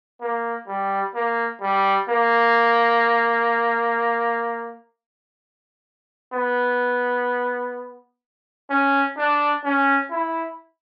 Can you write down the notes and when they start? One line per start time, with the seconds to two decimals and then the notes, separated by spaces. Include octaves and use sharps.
0.21 A#3
0.68 G3
1.15 A#3
1.62 G3
2.09 A#3
6.33 B3
8.70 C#4
9.17 D4
9.64 C#4
10.11 E4